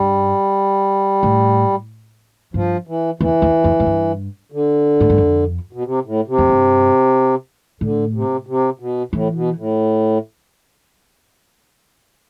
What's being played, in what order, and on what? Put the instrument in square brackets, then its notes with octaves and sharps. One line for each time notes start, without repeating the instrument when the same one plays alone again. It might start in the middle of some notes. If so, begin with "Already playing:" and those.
Already playing: [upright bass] G2 [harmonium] G3
[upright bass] A2
[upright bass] G2 [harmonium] F3
[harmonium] E3
[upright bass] E2 [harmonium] E3
[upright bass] E2
F2
A2
G2
[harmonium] D3
[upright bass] A2
G2
F2
[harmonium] B2
C3
A2
C3
[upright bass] F2
G2
[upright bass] A2 [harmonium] D3
[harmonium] C3
C3
B2
[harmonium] A2 [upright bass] E3
[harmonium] B2
A2